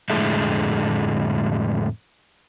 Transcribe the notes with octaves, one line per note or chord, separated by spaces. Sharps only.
F2 A2 D3 G#3 A3